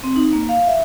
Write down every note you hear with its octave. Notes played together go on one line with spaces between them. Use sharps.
C4
D#4
A#3
F5
E5